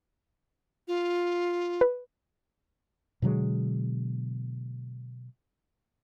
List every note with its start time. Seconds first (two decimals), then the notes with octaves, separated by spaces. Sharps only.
0.88 F4
1.81 B4
3.22 B2 D3 F#3 G#3